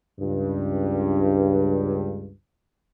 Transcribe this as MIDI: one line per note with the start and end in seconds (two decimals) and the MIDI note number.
0.19 2.30 37
0.19 2.30 43